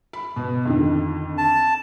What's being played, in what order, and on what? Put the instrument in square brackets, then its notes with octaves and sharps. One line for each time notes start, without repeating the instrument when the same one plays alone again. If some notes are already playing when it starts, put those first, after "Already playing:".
[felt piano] B5
B2
F2 D3 D#3
[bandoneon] A5